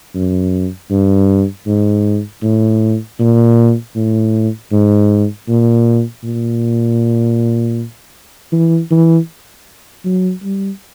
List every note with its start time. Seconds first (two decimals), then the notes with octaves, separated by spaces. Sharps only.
0.15 F#2
0.91 G2
1.67 G#2
2.43 A2
3.20 A#2
3.95 A2
4.72 G#2
5.48 A#2
6.23 A#2
8.52 E3
8.91 E3
10.05 F#3
10.43 G3